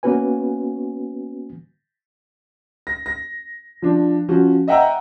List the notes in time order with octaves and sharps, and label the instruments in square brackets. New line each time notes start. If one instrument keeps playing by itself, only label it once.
[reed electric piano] A#3 B3 C#4 F#4 B4 G#5
[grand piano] A#6
A#6
F3 D4
F3 C#4 F#4
D#5 E5 F#5 G5 A#5 E6